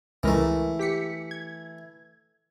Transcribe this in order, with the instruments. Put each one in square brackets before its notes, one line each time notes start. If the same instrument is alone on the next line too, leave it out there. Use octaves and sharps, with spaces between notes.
[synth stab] C#2 G#3 A#4 [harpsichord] E3 A3
[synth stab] G4 B6 C#7
G#6